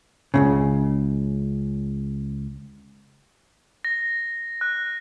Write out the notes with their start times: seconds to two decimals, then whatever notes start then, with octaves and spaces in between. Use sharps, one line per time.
0.34 C#2 G#2 C#3
3.85 A#6
4.61 F#6